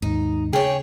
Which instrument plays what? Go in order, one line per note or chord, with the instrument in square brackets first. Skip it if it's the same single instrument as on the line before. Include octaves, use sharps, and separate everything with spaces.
[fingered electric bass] D#2 G#2 [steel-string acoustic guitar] D#4
[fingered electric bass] C#3 [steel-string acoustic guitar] G#4 C#5 [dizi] G5